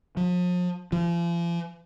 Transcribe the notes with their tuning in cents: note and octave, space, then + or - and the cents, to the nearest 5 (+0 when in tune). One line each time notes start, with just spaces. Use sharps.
F3 +40
F3 -40